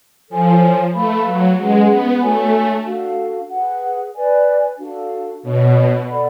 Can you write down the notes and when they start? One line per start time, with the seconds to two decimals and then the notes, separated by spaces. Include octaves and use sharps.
0.29 F3 A4 C#5 G#5
0.94 A3 B4 F5 B5
1.26 F#3
1.58 G#3 C#4 G#4 B4 F#5
1.90 B3
2.21 A3 D4 F#4 C#5 G#5
2.86 D4 F#4 A4 F5
3.50 G#4 B4 F#5
4.15 B4 D5 G#5
4.78 D4 F#4 A4 F5
5.43 B2 D4 F#4 C#5
6.07 A4 D5 F#5 B5